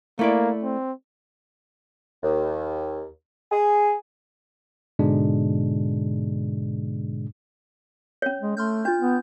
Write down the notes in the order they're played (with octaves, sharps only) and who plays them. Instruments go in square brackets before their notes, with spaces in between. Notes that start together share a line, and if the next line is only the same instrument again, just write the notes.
[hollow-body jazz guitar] A3 E4 D5 [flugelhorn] A#3
[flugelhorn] C4
[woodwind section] D#2
G#4
[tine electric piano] G#2 B2 D3 G#3 D4
[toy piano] C#4 C#5
[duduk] G#3
[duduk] A3 [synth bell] C6 F6 G6
[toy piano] D4 [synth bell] F4 G6
[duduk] B3